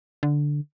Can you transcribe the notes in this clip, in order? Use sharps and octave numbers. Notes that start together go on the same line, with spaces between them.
D3